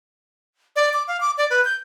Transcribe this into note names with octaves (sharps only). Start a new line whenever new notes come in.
D5
D6
F5
D6
D5
B4
G6